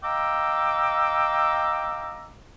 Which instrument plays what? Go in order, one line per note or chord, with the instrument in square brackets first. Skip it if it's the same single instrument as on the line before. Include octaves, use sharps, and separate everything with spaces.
[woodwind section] D#5 F5 G5 A#5 D6 E6